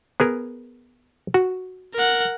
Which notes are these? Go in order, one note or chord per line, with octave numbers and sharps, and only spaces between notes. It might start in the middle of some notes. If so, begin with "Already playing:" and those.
B3 G#4 A#4
F#4
A#4 F#5